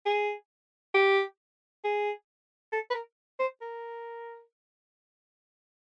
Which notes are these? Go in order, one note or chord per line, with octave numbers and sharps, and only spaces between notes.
G#4
G4
G#4
A4
B4
A#4
C5
A#4